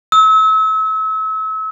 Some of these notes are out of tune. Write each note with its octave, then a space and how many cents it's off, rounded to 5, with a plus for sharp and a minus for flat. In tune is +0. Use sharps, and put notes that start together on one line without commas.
E6 -35